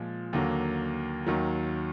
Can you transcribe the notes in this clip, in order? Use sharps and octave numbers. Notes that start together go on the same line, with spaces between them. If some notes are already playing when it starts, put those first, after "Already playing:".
Already playing: A#2 F3 G#3
D#2 D3 F#3 A#3
D#2 D#3 F#3